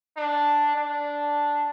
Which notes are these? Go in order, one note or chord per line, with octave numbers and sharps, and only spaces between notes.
D4
D4